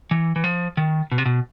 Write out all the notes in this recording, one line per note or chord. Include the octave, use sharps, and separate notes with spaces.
E3
E3
F3
D#3
B2
C3
B2